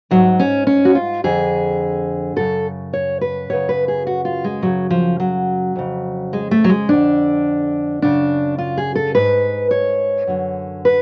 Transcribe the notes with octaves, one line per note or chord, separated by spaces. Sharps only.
G#2 F#3
C#4
C#4
F#4
F4
F2 D3 G#4
F#2 C#3 A4
C#5
B4
F#2 C#3 C#5
B4
G#4
F#4
F4
G#3
F#2 C#3 F#3
F3
F#3
F2 C#3
G#3
A3
F#3
G#3
F2 D3 D4
F#2 C#3 D4
F4
G#4
A4
G#2 B4
C#5
F#2 D3
B4